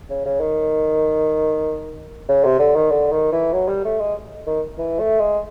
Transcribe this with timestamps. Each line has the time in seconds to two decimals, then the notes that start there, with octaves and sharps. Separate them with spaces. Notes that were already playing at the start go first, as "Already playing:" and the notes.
0.10 C#3
0.25 C#3
0.40 D#3
2.28 C#3
2.44 C3
2.59 D3
2.75 D#3
2.91 D3
3.12 D#3
3.32 E3
3.53 F#3
3.68 G3
3.84 A3
3.99 G#3
4.46 D#3
4.78 E3
4.99 A3
5.19 G#3